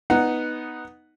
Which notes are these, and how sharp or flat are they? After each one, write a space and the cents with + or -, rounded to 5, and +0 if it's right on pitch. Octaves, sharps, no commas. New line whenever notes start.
B3 +0 D#4 +0 F#5 +0